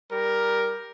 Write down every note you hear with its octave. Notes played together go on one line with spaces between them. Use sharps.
G3 A#4